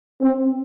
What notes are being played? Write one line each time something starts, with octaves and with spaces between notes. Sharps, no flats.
C4